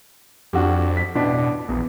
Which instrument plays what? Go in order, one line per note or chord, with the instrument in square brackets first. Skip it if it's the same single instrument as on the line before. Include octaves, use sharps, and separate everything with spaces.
[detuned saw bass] F2 [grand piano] D4 F#4 G4
[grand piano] B6
[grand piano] A1 D4 [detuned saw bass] B2
[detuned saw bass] A#1 [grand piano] E2